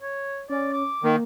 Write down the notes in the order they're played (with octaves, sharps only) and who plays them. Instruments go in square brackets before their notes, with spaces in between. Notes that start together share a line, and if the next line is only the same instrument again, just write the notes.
[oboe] C#5
[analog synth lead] C#4 [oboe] D5
[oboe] D6
[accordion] D#3 [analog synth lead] A#3